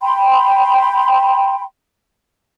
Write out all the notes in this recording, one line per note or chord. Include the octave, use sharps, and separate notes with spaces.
G5 B5 C6